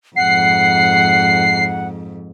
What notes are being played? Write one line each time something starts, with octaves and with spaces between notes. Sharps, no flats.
F2 G#2 F#5 C7